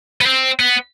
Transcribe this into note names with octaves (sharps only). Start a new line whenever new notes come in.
B3
C4
B3